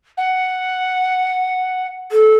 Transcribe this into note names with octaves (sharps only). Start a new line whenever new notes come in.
F#5
A4